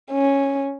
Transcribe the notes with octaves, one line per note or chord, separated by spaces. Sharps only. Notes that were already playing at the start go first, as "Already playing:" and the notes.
C#4